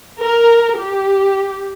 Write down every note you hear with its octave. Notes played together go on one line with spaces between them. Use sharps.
A#4
G4